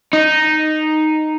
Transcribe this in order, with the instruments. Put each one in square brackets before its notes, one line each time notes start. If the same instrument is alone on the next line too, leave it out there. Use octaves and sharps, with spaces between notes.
[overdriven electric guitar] D#4